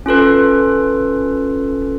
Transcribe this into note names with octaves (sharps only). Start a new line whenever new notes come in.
C#4 F4 A4 B4